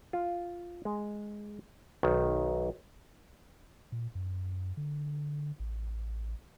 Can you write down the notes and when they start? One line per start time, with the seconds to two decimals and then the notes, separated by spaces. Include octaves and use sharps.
0.13 F4
0.85 G#3
2.03 B1 D#3
3.92 A#2
4.15 F#2
4.77 D3
5.60 A1